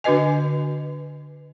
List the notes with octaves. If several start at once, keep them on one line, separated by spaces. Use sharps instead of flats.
D3 D4 F#4 B4 D#5 G#5